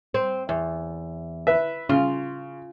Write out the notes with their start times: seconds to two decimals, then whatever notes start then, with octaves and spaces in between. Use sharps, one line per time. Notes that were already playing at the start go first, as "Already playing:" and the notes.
0.14 C4
0.49 E2
1.47 B4 E5
1.89 C#3 F4